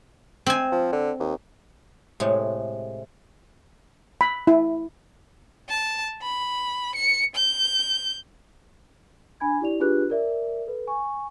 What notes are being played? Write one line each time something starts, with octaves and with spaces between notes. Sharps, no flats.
C4 G#5
F3
D3
D#2
A2 C3 G#3
B5
E4
A5
B5
C#7
G6
D4 G#5 B5 G#6
E4 G4 D5 F7
D4 F4 G4 G#4 B4 F#6
A#4 D5 E5
A4 B4
G#5 C#6